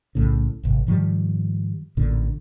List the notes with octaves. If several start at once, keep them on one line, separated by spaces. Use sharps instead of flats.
B1 A2 C#3
D#1 G#1 C3
G#2 D#3 F3 G3
A1 A#2 D3